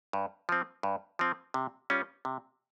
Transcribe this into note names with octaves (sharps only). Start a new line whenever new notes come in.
G2
F3 C4
G2
F3 C4
C3
G3 C#4 F4
C3